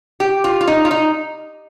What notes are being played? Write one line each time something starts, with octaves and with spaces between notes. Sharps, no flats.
G4
F4
F4
D#4
F4
D#4